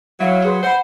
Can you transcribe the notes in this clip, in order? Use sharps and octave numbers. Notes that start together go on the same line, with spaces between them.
F#3 E4 F5
G#4 B4 C5
C5 F#5 B5